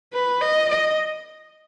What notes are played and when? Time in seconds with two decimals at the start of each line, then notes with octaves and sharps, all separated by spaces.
0.13 B4
0.41 D#5
0.69 D#5